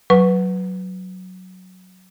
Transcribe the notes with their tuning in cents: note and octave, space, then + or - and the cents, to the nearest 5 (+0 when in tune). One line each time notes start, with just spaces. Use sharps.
F#3 +0 B4 +0 C#6 +0